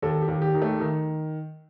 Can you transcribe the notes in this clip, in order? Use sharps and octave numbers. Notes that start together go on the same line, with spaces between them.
D#2 A4
G4
D#2
G4
D#3
A3
D#3